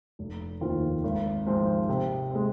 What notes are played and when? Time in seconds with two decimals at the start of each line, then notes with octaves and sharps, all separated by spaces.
0.19 F1
0.61 D#2 D#3 C4 F4
1.04 G#1
1.46 G#2 F3 C4
1.89 C3
2.31 G#3 C4